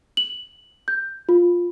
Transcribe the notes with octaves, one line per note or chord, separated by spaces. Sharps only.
F#7
G6
F4